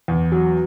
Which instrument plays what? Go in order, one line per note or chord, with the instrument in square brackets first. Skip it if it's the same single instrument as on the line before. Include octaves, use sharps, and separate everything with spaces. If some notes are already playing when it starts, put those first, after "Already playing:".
[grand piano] E2
F#3